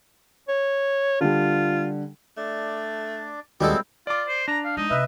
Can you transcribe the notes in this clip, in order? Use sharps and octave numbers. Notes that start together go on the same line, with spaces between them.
C#5
D3 G3 F4
A3 D4 D5
D#2 B2 G3 G#3 C4 E4 A4
F4 D5 D6
C5
D4 A#5
F5
G#3 D#4
C3 B4 D#5 E5